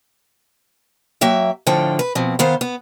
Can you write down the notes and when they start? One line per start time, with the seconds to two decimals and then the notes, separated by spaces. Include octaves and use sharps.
1.21 F#3 A#3 E5 G5
1.67 A2 D3 F3 F4 G5
1.99 B4
2.15 B2 F3 C4
2.39 D#3 B3 C5 F5
2.61 B3